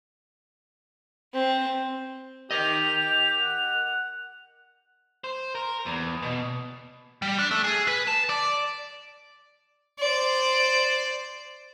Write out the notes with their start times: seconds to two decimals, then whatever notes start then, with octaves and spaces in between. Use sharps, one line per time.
1.33 C4
2.51 G4 A#4 D#5 F7
3.41 F#5
5.24 C5
5.55 A#4
5.86 E2
6.22 B2
7.22 G3
7.39 D4
7.51 A3
7.64 G#4
7.88 B4
8.07 A5
8.29 D5
10.00 C5 D5